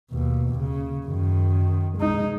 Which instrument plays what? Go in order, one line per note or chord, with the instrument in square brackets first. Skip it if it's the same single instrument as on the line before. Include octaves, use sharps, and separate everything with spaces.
[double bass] D#2 B2
C#3
F#2 D#3
G#3 D#4